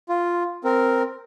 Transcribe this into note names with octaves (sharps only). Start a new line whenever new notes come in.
F4
C4 A#4